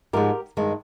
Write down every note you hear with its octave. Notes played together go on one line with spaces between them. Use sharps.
G#2 F3 G#3 G4 A#4
G2 D#3 G#3